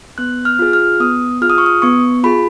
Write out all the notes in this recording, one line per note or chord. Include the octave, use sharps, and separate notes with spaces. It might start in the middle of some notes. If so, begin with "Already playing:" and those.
B3 F#6
F6
F4 G#4
F6
B3 D#6
F4 G#4 F6
D#6
C#6
D#6
B3 C#6
F4 G#4 B5